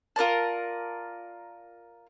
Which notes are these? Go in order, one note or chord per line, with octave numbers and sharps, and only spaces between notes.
F4 A#4 D5 A5